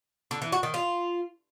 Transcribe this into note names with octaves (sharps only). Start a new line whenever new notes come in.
D3
E3
F#4
D#3
F4